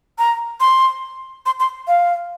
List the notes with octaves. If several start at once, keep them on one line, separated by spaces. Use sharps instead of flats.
A#5
C6
C6
C6
F5